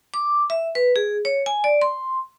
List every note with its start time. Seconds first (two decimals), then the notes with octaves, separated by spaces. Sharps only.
0.14 D6
0.50 E5
0.75 B4
0.96 G#4
1.25 C#5
1.46 G#5
1.64 D5
1.82 C6